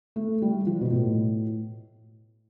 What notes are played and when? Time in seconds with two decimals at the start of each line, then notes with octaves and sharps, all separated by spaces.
0.16 A3
0.42 G3
0.67 F3
0.81 B2
0.91 A2